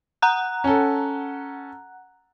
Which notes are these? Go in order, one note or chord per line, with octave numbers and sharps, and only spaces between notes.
F#5 A#5 F#6
C#4 A4